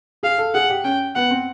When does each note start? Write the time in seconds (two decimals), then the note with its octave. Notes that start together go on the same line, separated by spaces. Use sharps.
0.23 G#4 F5
0.38 A4
0.55 G#4 F#5
0.70 G4
0.84 C#4 G5
1.15 B3 F#5
1.31 C4